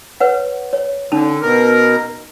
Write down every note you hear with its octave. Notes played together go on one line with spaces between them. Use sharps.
B4 C#5 F#5
C#5
D3 C#4 D#4 A5
B2 A#4